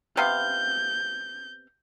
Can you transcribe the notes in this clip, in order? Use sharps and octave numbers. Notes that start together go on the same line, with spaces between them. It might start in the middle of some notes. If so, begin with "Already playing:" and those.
C3 B3 F5 G6